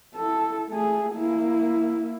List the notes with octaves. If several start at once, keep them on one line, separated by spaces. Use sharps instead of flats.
E4 A4
A3 G#4
A#3 E4